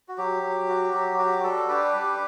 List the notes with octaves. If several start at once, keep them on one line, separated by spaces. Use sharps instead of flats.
F#4
F#3 G4
F#3
F#4
F#3
F#4 G4
G3 F#4 A4
D4 G4 B4
G3